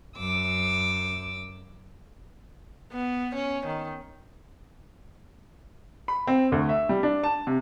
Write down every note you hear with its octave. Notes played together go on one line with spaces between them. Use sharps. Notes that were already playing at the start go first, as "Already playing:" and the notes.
F#2 D6 E6
B3
C#4
D#3
B5
C4
D2
E5
G3
D4
A5
C3